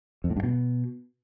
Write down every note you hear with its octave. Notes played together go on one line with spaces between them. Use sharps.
F2
A2
G2
B2